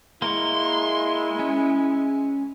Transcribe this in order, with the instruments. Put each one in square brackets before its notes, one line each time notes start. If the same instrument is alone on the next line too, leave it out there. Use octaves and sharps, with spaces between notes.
[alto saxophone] G#3 [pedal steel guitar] A#3 A#4 C#6 [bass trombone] E4 [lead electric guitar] C6
[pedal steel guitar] C#4 C#5